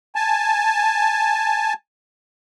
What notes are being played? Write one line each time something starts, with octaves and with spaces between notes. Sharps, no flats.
G#5 A5